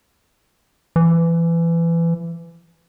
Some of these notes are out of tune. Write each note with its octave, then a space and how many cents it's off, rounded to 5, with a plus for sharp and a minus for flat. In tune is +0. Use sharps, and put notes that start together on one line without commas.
E3 +25